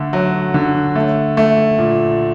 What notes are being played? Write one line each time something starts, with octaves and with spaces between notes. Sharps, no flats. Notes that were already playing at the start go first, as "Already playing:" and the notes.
Already playing: D3 A3
F#3
D3
A3
A3
A#2